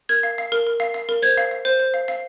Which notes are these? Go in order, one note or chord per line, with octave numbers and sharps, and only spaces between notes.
A#4 G#6
F5
F5
A#4
A#4
F5
F5
A#4
C5 G#6
F5
F5
C5
C5
F5
F5